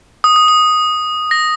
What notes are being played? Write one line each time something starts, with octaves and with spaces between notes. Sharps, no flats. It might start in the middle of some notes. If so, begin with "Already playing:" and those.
D#6
D#6
D#6
A#6